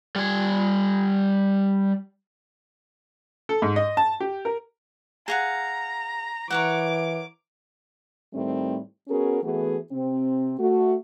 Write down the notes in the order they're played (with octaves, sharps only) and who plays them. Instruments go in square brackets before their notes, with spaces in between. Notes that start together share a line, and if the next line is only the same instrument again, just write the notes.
[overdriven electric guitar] G3 G#5
[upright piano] A4
G#2
D#5
A5
G4
A#4
[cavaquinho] G#4 F5 F#5 [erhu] A#5
[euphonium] E3 [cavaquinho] A#4 C#5 F#5 [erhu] D6
[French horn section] A2 D#3 G3 A3 C4
B3 C#4 F#4 G#4 A#4
E3 A3 B3 F#4 G#4
C3 C4
A3 F#4